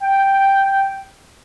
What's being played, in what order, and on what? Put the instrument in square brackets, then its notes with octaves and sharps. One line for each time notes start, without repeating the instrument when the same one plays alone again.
[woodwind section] G5